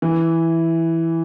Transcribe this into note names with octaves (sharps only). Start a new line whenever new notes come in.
E3